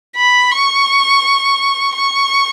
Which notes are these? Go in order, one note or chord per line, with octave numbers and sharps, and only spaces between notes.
B5
C#6
C#6